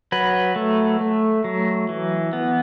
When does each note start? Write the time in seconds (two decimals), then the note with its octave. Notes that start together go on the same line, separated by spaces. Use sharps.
0.12 F#3 B4
0.56 A3
1.01 A3
1.44 F#3
1.89 E3
2.33 B3